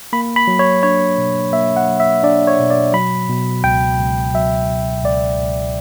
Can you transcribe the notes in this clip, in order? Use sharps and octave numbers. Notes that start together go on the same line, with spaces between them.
A#3 B5
B5
F#3
C#5
D4 C#5
B2
A#3 E5
F#5
F#3
E5
D4 D5
C#5
B2
D5
F#3 B5
B2
C#2 G5
C#2
F#3 E5
B2
C#2 D5
C#2